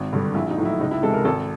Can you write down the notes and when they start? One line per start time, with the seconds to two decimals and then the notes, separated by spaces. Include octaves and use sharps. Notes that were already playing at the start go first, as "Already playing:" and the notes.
Already playing: G#1
0.13 G2 D3 G3
0.34 A#1 E4
0.50 D#4
0.58 A2 F#3
0.65 E4
0.80 C#2 D#4
0.91 E4
1.02 C3 E3 G#3 A4
1.13 A#4
1.25 G#1 A4